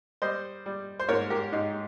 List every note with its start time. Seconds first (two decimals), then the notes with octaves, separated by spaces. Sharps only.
0.22 G3 C5 D#5
0.66 G3
0.99 C5
1.09 G#2 A#4 C#5
1.30 G4 A#4
1.52 G#2 D#4